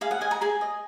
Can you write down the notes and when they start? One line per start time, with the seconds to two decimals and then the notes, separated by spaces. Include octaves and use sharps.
0.01 G#4 F5
0.11 F#5
0.21 D#5 G#5
0.31 A#5
0.41 G#4 G#5
0.61 D#5